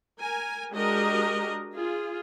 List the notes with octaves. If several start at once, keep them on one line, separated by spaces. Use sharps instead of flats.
A#4 G#5
G#3 D4 F#4 G4 A#4 D#5
F4 G#4